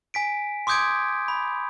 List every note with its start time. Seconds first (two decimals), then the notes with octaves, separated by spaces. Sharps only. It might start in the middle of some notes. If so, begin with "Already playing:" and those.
0.14 G#5 B6 D7
0.67 C6 D6 D#6 G6 G#6 D7
1.28 B5